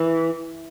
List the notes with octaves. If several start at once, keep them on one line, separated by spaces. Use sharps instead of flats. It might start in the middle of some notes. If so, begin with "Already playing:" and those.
Already playing: E3